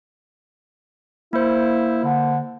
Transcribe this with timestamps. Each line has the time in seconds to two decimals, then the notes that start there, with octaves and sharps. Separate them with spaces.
1.33 A#3 E4 C5
2.04 D3